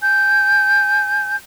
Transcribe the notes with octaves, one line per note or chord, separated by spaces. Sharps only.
G#5 G6